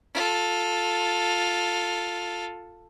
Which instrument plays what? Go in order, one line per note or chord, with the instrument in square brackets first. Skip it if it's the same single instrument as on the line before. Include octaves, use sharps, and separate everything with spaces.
[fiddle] F4 A4